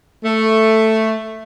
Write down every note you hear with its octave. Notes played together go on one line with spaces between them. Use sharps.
A3